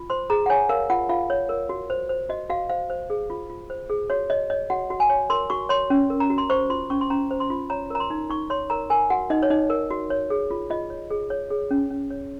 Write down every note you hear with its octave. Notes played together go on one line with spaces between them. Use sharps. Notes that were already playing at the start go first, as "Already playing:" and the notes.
Already playing: F4
C5 C6
G#4 A#5
F#5
C#5 G#5
A#4 F5
F4 F#5
F4 F5
C#5
A#4
F#4
C5
C5
F#4 D#5
F#4 F5
C5 F5
C5
G#4
F4
F4
C5
G#4
F#4 C#5
C#5 D#5
C#5 D#5
F#4 F#5
F#4
G#5
C#5
A#4 C6
F#4 C#6
C#5 C6
C#4
A#4
A#5
F#4
C6
C5 C#6
F4 C6
C#4 C#6
C6
C#4 A#5
C5
C6
F4
C#5 A#5
A#4 A#5
C6
D#4
D#4 C#6
C#5 C6
A#4 A#5
A#4 G#5
F#4 F#5
D#4 D#5
C#5
D#4 D#5
A#4
F#4
C#5
G#4
F4
F4 D#5
C#5
G#4
C#5
G#4
C#4
C#4
C#5